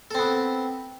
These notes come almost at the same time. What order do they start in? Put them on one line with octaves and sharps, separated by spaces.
A4 C4 B3